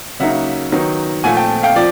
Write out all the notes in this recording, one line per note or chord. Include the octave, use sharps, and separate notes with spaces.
C#3 F#3 A#3 D#4 E5 F#5
D#3 F#3 B3 D#4
A#2 F3 A3 F#5 G#5
G5 A5
F5 G5
F3 D5